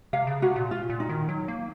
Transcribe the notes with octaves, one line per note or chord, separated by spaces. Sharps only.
C3 F5
C#3
C3 F#4
A#2
F4
A#2
D#4
D#3
F#3
A#3